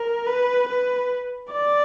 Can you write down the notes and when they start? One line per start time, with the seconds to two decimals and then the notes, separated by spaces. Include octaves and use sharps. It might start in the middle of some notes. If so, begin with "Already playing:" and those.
Already playing: A#4
0.27 B4
0.69 B4
1.53 D5